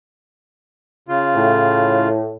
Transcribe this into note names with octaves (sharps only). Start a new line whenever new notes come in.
C#3 F4
A2